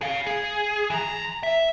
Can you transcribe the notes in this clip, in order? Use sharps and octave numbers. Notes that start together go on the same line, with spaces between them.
G#4 F5
G#4
E3 A#5
E5